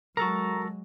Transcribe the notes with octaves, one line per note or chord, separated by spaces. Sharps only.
F#3 G#3 F#4 A4 A#4 A#5